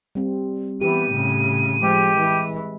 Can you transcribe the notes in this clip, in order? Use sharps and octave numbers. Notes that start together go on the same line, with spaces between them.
G3 C4
E3 B3 G4 D#7
A2 C#3
F3 G#3 G4
E3